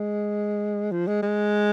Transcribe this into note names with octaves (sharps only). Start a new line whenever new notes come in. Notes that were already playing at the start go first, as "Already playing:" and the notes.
Already playing: G#3
F3
G#3
G#3